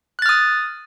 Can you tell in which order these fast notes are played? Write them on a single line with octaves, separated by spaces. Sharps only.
F#6 A6 F6 D#6